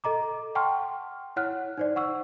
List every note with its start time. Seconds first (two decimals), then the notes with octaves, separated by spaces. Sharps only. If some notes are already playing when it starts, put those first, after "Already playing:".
0.04 A4 D#5 A#5 D6
0.55 F#5 G5 A5 C6 C#6 F6
1.36 E4 C#5 F#5 F6 F#6
1.77 D#4 C5 D5
1.96 F#5 C#6 E6